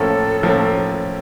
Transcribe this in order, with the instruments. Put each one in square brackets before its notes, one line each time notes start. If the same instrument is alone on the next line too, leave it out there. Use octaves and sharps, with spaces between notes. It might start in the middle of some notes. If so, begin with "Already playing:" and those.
Already playing: [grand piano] A2 F3 A#3 C#4 [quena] A4
[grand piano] A2 F3 A#3 C#4